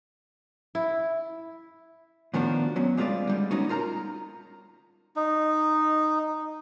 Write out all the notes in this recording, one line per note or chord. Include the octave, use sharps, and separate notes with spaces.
E4
A2 D#3 F3 B3 D4 F#4
F#3 B3 C#4
G3 G#3 C4 F4 B4 D5
D3 G3 G#3
G#3 B3 C#4 D#4 F#4
D#4 F4 A#4 A5 A#5
D#4